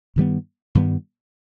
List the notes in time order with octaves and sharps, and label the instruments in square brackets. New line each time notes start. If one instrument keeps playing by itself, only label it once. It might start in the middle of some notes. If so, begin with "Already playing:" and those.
[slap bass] G2 D#3 G3 B3
G2 D#3 G3 B3